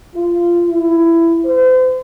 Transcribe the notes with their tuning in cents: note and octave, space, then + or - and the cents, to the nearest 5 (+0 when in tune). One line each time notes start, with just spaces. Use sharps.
F4 -15
E4 +15
C5 -35